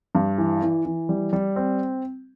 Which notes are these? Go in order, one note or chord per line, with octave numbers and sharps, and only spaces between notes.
G2
E3
E3
E3
G3
G3
C4